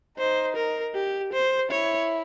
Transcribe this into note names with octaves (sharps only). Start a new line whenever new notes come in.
D#4 C5
A#4
G4
C5
E4 C#5